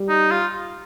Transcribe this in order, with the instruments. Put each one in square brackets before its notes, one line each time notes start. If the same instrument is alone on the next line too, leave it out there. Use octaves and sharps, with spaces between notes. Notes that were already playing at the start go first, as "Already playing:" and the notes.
Already playing: [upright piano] G3
[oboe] D#4
F4